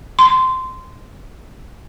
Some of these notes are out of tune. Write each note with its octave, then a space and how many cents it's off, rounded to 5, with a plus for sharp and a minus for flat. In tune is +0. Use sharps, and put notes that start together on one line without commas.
C6 -15